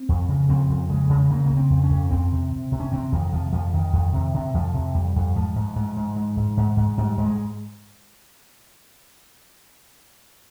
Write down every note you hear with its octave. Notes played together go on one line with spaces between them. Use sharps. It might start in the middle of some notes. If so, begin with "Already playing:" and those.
Already playing: C4
F2
C#3
F2 C4
F2
C#3 G#3
C#3
C#3 A#3
C#3 A#3
C4
F2
C#4
F2
F2 C4
C3
C3
C3
C#4
C3 C4
F2 D#3
C3 F3
F2 F3
F2 D#3
F2
C3
C3
F2 F3
C3
F2 G3
F2
G#2 F3
G#2
G#2
G#2
G#2
G#2
G#2
G#2
G#2 G3
G#2
G#3